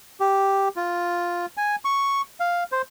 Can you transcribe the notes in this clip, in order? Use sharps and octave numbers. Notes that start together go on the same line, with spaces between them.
G4
F4
G#5
C#6
F5
C5